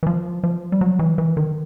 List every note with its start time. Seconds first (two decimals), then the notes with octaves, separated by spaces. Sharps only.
0.03 E3
0.07 F3
0.43 F3
0.72 G3
0.81 F#3
0.99 E3
1.18 E3
1.37 D#3